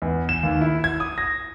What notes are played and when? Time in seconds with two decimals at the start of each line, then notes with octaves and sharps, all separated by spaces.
0.02 E2
0.29 E7
0.43 D#2
0.61 E4
0.84 G#6
1.00 D#6
1.18 A#6